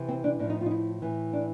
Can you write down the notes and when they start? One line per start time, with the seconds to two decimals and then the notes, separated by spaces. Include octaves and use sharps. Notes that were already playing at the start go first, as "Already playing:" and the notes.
Already playing: C3 E3
0.08 C4
0.24 D4
0.39 A2 D4
0.44 F3
0.50 D#4
0.61 F4
0.66 D#4
0.71 E4
1.02 A2 E3
1.33 D4